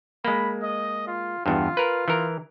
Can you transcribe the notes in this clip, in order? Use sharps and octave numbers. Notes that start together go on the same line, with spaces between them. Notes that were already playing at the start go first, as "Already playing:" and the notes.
G#3 A#3 B5
D#5
F4
E2 G2 F4
A#4 B4
E3 A#4